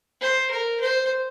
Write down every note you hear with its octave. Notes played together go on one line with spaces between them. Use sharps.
C5
A#4
C5